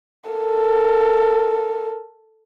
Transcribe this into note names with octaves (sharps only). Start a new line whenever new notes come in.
A4 A#4